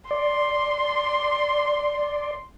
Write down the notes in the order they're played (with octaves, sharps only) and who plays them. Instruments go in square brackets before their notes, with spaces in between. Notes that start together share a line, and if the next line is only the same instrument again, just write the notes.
[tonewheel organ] D5 [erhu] C6